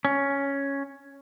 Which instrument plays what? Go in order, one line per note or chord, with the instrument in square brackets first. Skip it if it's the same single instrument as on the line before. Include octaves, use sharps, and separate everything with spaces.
[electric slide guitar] C#4